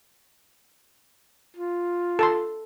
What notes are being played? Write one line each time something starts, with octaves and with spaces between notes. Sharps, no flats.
F4
A4 A5 C6